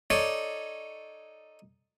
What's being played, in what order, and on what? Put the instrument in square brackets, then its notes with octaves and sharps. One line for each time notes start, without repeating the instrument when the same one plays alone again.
[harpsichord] D#4 A4 C#5 D5